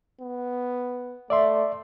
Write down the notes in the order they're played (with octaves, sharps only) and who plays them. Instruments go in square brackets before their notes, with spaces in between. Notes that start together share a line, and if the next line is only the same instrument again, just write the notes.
[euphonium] B3
[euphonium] A3 [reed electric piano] D5 E5 C6